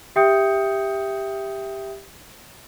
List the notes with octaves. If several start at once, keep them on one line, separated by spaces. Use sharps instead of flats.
G4 E5 G5 D#6 G6 C#7